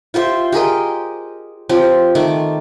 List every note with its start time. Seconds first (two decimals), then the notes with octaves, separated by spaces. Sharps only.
0.14 F4 G4 C5 E5
0.52 G4 G#4 A#4 D#5
1.69 F3 C4 G4
2.15 D#3 A3 A5 D6